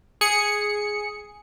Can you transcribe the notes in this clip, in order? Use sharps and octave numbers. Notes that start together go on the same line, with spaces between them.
G#4 C#7